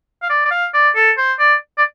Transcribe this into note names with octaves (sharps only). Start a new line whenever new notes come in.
F5
D5
D5
F5
D5
A4
C5
D5
D5